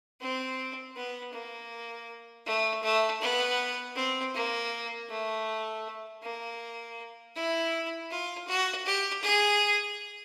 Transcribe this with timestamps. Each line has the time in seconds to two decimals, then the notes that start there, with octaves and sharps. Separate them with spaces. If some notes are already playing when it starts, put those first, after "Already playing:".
0.21 C4
0.96 B3
1.33 A#3
2.46 A3
2.83 A3
3.21 B3
3.96 C4
4.34 A#3
5.09 A3
6.22 A#3
7.35 E4
8.10 F4
8.48 F#4
8.86 G4
9.23 G#4